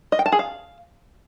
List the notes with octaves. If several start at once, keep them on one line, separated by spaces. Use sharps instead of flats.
D#5
G5
A5
G#4
F5